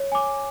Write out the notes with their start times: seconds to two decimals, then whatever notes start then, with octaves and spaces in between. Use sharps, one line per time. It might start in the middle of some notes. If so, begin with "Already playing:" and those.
Already playing: C#5
0.12 G#5 D6